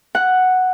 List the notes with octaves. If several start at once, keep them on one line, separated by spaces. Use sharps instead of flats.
F#5